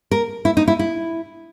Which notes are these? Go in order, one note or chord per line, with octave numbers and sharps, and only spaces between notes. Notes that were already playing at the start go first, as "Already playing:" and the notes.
A#4
E4
D#4
E4
E4